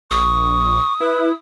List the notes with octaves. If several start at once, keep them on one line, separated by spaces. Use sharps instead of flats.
A#1 C#6 D#6
E4 B4